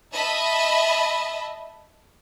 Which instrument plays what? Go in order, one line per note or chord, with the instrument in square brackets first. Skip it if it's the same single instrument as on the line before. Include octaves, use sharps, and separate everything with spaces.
[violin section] D#5 E5 A5 B5